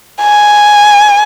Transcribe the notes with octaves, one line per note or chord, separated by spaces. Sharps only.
G#5